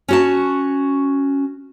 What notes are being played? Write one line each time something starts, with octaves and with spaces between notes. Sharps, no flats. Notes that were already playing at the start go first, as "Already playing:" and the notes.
C#4 F#4 A5